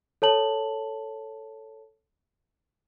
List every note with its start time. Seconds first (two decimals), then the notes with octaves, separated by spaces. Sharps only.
0.22 A4 C#5 A5 F#7